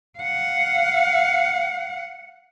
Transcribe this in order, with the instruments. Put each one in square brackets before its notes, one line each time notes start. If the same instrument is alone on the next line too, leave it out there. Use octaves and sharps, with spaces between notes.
[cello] F5 F#5